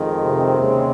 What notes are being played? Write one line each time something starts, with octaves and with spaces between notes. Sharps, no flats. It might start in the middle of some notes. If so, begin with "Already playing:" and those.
Already playing: F2 D#3 G#3
C3 C4
D#2 C#3 G#3